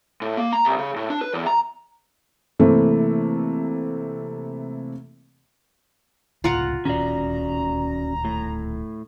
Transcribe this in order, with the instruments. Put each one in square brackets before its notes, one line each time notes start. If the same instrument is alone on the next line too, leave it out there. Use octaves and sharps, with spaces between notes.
[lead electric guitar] A2
A#3
A#5
C2
C#3
A2
D4
B4
E2
A#5
[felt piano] C3 E3 A3 A#3 C4
[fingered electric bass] C#2 A2 C3 [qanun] F4 A#4 F#5
[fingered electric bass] D1 A#2 D#3 [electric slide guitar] C#4 F#4 D5 [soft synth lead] A#5
[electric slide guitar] A2